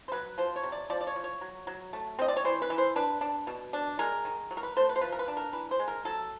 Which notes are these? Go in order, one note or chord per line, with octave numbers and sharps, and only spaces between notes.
C5
F#3 B4
F3 C5
C#5
C3
D5
F3 D5
D5
C#5
F3
C#5
F#3
F#3
A3
C4 D#5
D5
C#5
E3 C5
B4
E3
C5
D4 B4
D4
B2
D4
G#3 A#4
D#3
F#3
A#4
B4
A3 C5
B4
C5
F3 B4
A#4
B4
D4
A#4
E3 B4
C5
G#3
A#4
F#3 A4